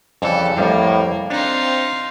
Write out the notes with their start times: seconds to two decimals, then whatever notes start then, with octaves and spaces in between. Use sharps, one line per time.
0.22 F2 C#3 E3 G3 A4
0.57 F2 A2 G3 A#3 A5
1.30 C4 D4 D#4 F4